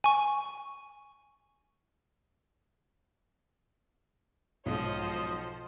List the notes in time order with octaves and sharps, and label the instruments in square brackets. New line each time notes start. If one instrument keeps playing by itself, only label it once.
[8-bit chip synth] G#5 C#6
[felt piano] B1 G#2 [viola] F3 C5 [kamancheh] C#5 D#5